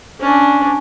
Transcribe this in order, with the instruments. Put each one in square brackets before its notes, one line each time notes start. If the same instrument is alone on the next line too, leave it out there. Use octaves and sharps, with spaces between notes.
[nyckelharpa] C#4 D4